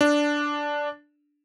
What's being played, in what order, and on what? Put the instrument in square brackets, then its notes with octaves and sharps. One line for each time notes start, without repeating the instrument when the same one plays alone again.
[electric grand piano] D4